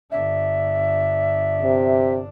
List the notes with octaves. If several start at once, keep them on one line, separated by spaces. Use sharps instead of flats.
G1 D4 E5
C3